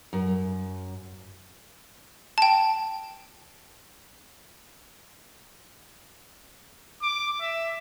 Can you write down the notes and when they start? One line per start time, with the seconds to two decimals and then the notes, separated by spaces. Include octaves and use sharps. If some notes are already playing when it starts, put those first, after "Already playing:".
0.13 F#2
2.38 G5 A5
7.02 D6
7.41 E5